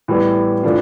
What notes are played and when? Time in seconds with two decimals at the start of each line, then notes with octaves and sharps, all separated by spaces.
0.08 A2 E3 G3 B3
0.63 A2 E3 A3 D4 F4